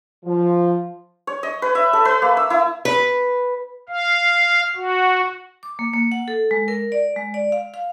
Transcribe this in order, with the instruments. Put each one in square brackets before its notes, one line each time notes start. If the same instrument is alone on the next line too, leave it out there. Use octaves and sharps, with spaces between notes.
[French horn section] F3
[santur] C#5
D#5
B4
E5
A4
B4
A#3
E6
E4
[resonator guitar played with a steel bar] B4
[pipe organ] F5
F#4
[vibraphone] D6
A#3
A#3
F#5
A4
G#3
A#4
D5
G#3
D5
F5
F5